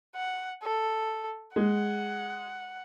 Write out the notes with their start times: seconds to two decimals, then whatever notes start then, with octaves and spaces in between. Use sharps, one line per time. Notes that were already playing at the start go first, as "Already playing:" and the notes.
0.15 F#5
0.63 A4
1.56 G#3 F#5